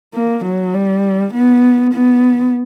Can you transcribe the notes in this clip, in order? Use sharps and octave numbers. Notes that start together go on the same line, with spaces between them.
A#3
F#3
G3
B3
B3